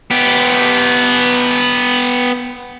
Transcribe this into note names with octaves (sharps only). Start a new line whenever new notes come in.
B3 G4